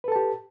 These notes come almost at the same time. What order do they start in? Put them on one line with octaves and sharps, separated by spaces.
B4 A4 A5 G4